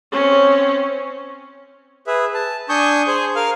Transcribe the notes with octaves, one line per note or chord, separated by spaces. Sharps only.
C4 C#4
G#4 B4 E5
A5
D4 G#5 C#6 D#6 G6
G#4 C5 G#5
A#4 F5 F6